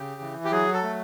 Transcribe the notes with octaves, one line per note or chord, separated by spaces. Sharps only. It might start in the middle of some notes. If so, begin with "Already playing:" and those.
Already playing: C#3 G4
E3
G4
F#3 G#4
A4
A3